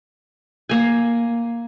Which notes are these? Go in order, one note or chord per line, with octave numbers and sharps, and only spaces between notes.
A#3 G#5